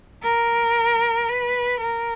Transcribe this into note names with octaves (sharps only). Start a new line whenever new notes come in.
A#4
B4
A#4